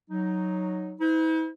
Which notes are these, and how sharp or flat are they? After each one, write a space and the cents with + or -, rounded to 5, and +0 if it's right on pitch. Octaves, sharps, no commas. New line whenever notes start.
F#3 +0 D#4 +0
E4 -45 C5 -45